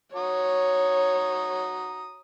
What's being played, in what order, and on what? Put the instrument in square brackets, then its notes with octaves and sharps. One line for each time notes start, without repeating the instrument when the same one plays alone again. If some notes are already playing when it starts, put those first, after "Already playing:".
[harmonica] F#4 A#5 D#6 [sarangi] C#5